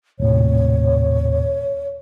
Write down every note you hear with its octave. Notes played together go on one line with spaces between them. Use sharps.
D#1 A2 C3 C#5